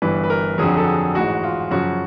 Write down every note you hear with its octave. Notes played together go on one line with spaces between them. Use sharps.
G1 G2 E3 B4
B4
A#4
F2 D3 F#3 G#4
A4
G#4
A1 G#2 E3 G#3 F#4
F4
F#2 C#3 F3 F#4